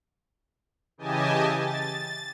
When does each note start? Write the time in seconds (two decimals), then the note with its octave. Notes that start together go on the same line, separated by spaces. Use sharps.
0.98 C#3 E3 G4 D#5 G#5 A5
1.57 A6